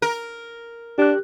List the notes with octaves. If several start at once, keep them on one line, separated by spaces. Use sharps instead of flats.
A#4
D4 G4 F#6